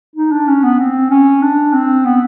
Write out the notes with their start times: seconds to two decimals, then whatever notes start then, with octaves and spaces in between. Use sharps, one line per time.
0.16 D#4
0.32 D4
0.47 C#4
0.63 B3
0.79 C4
1.10 C#4
1.42 D4
1.73 C4
2.05 B3